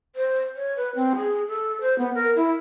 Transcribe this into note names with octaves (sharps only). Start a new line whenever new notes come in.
C5
C#5
B4
C4
G#4
A4
C5
B3
A#4
E4